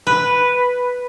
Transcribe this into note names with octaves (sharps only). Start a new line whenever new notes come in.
B4